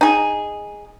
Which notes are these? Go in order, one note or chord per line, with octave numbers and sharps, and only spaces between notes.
D#4 G#4